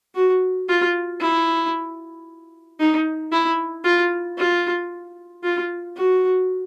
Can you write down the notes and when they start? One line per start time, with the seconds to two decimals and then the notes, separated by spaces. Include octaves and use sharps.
0.15 F#4
0.69 F4
1.20 E4
2.80 D#4
3.32 E4
3.85 F4
4.38 F4
5.44 F4
5.96 F#4